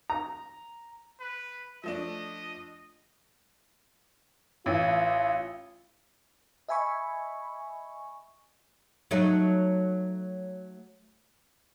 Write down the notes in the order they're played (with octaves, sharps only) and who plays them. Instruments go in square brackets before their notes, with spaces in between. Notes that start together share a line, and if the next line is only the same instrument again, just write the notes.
[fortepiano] A#5
[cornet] B4
[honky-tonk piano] F3 A3 D4 [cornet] D#5
[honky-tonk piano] A1 E3 [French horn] F4
[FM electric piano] D#5 E5 G#5 B5 C#6
[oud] F#3 A3 D#4